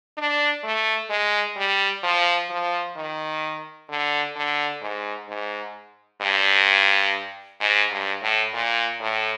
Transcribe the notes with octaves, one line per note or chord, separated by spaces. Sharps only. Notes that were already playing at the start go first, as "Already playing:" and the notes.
D4
A3
G#3
G3
F3
F3
D#3
D3
D3
G#2
G#2
G2
G#2
G2
A2
A#2
A2